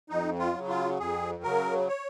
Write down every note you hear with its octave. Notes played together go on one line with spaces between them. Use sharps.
F2 D#4
F4
C#3 F#3
F4
F2 G#4
C#3 F#3 A#4
C#5